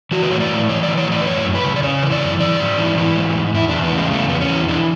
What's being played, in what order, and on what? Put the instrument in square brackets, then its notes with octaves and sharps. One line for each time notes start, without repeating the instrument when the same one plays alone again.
[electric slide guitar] E3 F#4
B4
A2 C#5
D5
A2
E3 C#5
D5
E3
C#5
A2 D5
B4
F#2 C#5
F#2
B4
C#3
D5
C#3 C#5
E3
D5
F#2
E3 D5
G#2
E3
E3
G#2
G#2
E2 E4
D4
E2
B3
C#3
G#3
E2 A3
E2 B3
C#4
E3
E3 D4